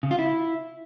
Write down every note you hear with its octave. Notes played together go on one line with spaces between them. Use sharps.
C#3
F4
E4